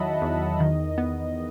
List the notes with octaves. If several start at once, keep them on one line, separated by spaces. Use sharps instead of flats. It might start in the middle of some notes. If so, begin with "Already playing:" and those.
Already playing: E2 D#3 F#3 D#5 E5 F#5 A5 B5
E2
D#3
B3